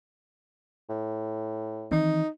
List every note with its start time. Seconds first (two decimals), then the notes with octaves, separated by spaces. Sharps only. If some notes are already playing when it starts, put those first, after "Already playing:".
0.90 A2
1.92 D#3 E3 C4 D#4